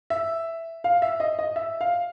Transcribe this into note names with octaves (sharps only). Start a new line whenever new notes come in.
E5
F5
E5
D#5
D#5
E5
F5